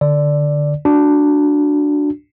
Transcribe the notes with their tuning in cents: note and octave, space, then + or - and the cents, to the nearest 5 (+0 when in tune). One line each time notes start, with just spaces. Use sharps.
D3 +0 D5 +0
D4 +0 F#4 -10